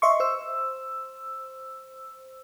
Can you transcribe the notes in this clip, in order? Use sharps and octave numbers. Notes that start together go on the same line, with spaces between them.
D#5 E5 C6 C#6
C5 E6